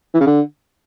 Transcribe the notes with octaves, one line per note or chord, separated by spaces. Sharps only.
E3
C#3
D3